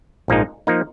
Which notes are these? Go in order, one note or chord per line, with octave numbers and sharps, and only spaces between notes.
A#1 G#2 F3 A#3 D#4
F3 A#3 D#4